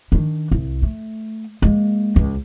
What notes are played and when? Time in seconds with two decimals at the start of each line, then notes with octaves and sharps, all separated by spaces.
0.12 D#3 D4
0.51 C2
0.82 A3
1.62 G#3 A#3
2.16 C#2